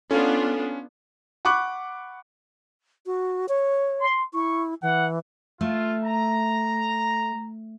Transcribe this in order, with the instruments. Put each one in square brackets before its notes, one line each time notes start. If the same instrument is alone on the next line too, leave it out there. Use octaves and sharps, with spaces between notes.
[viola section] B3 D4 F4 [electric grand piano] C#4 [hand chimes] A4
[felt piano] F#5 B5 C#6 D6 F#6
[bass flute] F#4
C#5
[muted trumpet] C6
[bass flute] E4 [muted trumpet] C#6
[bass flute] E3 [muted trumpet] F#5
[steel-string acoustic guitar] A3 [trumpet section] F4
[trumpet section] A#5